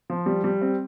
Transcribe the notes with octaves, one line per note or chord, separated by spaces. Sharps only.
F3
G3
G3
C4